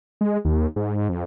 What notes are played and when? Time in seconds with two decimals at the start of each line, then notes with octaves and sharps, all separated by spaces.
0.21 G#3
0.45 D#2
0.76 G#2
1.09 F2